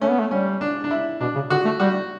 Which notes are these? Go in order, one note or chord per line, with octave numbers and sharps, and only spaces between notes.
A3 C#4
B3
A3
G3 C#4
D4
D4
E4
B2 D4
C#3
D3 F#4
A3
G3 F#4